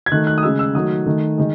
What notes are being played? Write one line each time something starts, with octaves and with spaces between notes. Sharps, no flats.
G#6
D#3 A3 F#6
F#6
D#6
C#3 G#3 E6
E6
D#3 F#3 A3 D#6
D#3 A3
D#3 G#3